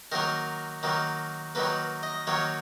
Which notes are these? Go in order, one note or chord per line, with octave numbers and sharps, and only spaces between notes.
D#3 F#3 A#3 A#4
D#3 F#3 A#3
D#3 F#3 A#3 B4
D#5
D#3 F#3 A#3 C#5